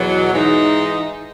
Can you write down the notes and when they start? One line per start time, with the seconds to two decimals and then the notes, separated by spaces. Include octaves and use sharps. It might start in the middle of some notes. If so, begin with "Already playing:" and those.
Already playing: E2 B2 F#3
0.31 G#2 E3 G#3 D#4